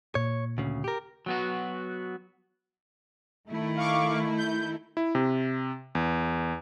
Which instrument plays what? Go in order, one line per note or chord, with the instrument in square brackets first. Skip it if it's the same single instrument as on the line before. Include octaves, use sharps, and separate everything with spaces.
[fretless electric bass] A#2 [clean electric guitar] C#5
[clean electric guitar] D2 C#3
G4 A#4
F#3 B3 F#4
[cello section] D#3 A3 E4
[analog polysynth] F5 C#6 D6
G6
[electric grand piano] E4
C3
E2